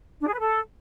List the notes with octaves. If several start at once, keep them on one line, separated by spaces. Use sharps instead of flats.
D4
G#4
B4
A4